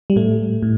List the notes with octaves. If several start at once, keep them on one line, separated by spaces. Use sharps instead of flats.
G3
A2 A3
A2